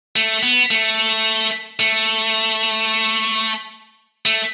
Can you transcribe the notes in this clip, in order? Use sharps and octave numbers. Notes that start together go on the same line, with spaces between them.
A3
B3
A3
A3
A3